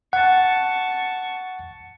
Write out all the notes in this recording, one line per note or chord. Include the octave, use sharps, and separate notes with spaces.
F#5 A5 C#6